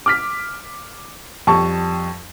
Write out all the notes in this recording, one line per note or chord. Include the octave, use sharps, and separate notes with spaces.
D6 F6 B6
F2 G3 A5 C#6